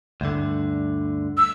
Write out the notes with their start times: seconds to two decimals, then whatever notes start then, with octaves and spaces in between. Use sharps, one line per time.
0.21 D2 G2 D3
1.37 E6